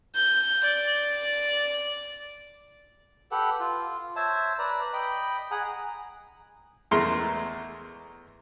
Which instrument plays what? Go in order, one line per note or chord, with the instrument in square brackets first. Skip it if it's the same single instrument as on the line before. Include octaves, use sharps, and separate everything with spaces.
[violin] G6
D5
[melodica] G4 A4 B4 F#5
F4
C5 C#5 E5 A5
B4 D5 A#5
D#5 G5 B5
G#4 F#5 G#5 A#5
[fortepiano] E2 G#3 A3 A#4 A#5 C6